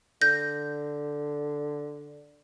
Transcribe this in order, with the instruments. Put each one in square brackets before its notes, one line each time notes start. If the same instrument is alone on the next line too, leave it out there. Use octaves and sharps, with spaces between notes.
[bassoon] D3 [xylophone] G6 A#6